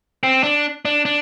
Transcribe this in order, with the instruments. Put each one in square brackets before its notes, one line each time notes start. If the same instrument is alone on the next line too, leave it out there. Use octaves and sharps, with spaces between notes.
[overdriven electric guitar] C4
D4
D4
D4